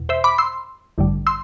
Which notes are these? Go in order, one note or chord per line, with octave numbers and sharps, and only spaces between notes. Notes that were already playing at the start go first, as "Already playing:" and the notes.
Already playing: E2 B2
C5 E5
B5 D6
C6 E6
A1 G2 D3 G3
C6 E6